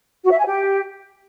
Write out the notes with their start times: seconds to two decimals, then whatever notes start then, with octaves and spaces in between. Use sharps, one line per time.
0.23 F#4
0.31 E5
0.38 G#5
0.45 G4